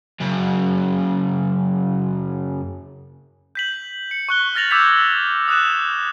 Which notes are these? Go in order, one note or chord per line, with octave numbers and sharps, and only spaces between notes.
F#2 C#3
G6 B6 F#7
C#7
C#6 F#6 G7
F6 A6 A#6 F7 F#7
D6 E6 G6 G#6 B6 F7
D#6 F#6 E7